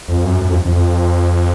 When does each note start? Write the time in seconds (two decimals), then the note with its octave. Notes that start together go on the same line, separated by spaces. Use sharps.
0.08 F2
0.25 F#2
0.42 F#2
0.49 F2
0.65 F2